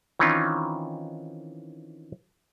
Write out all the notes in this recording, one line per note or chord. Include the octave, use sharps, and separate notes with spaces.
D#3 E3 C4 C#4 D#4 F4